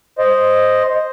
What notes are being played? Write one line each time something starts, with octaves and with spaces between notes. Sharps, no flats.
C5 D#5